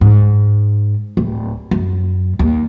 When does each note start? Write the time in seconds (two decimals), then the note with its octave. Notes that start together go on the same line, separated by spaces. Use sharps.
0.01 G#2
1.17 D1
1.71 F#2
2.39 D#2